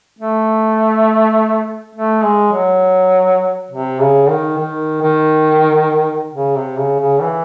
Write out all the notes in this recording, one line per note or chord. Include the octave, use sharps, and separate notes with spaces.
A3
A3
G#3
F#3
C3
C#3
D#3
D#3
D#3
C#3
C3
C#3
C#3
E3